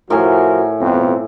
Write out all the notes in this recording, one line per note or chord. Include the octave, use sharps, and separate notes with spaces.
A2 F3 F#4 A#4 G#5
F2 B2